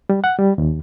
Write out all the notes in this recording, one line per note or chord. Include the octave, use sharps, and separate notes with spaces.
G3
F#5
G3
D#2